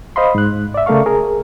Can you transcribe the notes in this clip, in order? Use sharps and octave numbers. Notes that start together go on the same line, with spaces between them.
C5 D#5 F5 B5 C6
G#2 F#6
D5 E5
C#3 A3 A#4 D5 F5 C#6
G#4 A#4